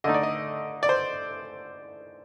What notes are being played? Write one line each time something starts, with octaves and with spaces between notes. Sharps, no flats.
D3 A3 D#4 D#5
D5
D#5
D5
C5